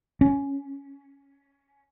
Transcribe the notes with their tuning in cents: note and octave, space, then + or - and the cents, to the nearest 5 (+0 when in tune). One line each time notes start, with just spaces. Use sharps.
C#4 +5